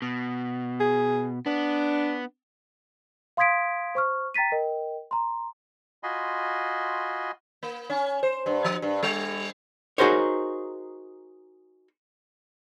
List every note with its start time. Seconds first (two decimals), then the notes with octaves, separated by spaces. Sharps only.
0.02 B2
0.80 G#4
1.46 B3 D4
3.37 F5 C6 D#6 G#6 B6 D7
3.95 C5 C#6 F6
4.34 G5 A#5 A6 B6 D#7
4.52 A#4 D#5 G5
5.11 A#5 C6
6.03 F4 F#4 D#5 G#5 B5 C6
7.63 A#3
7.90 C#4
8.23 C5
8.46 G2
8.64 F3
8.82 G2
9.03 G3
9.98 D#4 F#4 G#4 A#4 C5 C#5